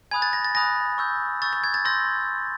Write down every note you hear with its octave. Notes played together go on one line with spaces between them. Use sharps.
G#5 B5 D#6 F#6 G#6
A6
A#6
A6
G#5 B5 D#6 F#6 A#6
C#6 E6 G6
C#6 E6 G6 A6
A6
G#6
A6
C6 E6 G6 A#6